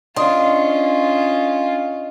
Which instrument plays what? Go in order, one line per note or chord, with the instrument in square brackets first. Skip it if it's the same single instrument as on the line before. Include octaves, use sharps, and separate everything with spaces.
[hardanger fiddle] C#4 F4 [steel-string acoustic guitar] D4 [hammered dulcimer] D#5 C6